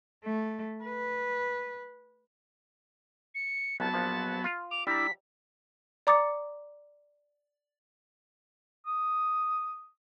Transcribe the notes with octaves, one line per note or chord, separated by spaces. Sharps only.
A3
B4
C#7
C2 F#3 B3 A5
A#1 F3
F4
D6 F7
G3 D4 E4 A#5 B6
D5 A#5 D6 D#6 A6 C#7
D#6